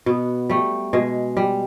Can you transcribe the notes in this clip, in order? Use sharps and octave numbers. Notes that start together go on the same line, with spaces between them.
B2 B3
G3 A3
B2 G#3
G3